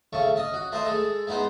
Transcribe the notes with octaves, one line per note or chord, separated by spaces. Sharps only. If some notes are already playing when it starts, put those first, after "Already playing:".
C#3 A3 C#6
C#4 D#5
F#4
A3 C5 D#5
G#3 A4
G#3 B3 D#4 C5